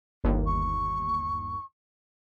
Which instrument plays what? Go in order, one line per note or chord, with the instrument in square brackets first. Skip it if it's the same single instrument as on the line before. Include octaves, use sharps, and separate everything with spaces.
[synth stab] G1 D#2
[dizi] C#6